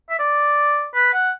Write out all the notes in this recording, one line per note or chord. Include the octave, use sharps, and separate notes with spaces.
E5
D5
B4
F#5